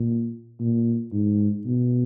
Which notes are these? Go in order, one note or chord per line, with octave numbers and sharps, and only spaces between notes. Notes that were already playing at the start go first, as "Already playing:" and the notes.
Already playing: A#2
A#2
G#2
B2